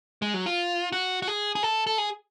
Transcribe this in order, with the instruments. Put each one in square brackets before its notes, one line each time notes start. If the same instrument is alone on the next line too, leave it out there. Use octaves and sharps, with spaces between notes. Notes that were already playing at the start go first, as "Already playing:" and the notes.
[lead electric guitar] G#3
F#3
F4
F#4
F#4
G#4
G#4
A4
A4
G#4